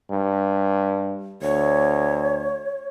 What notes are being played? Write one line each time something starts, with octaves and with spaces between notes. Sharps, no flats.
G2
D2 C#5